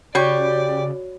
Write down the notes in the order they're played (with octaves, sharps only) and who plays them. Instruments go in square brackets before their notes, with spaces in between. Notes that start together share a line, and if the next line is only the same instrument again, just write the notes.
[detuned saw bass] C#3 [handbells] F#4 C#5 [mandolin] G4 C#6 [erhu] D5